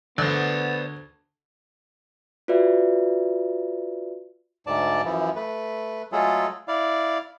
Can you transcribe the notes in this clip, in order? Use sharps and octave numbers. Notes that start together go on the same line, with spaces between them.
D2 B3 C5 D5 A6
F4 F#4 B4 D5 E5
D2 G#2 D5 A5
F#2 E3 F3
A3 B4
F#3 G#3 A3 F4 G#4 A4
E4 D5 F5